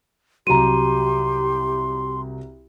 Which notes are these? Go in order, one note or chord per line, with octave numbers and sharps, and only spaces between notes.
C2 F#3 G4 A#5 C6 D#7